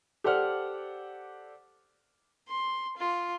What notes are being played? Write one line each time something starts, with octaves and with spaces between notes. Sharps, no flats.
G4 A4 C5 D5 F#5 F6
C6
F4